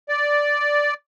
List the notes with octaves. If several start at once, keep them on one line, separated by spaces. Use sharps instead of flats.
D5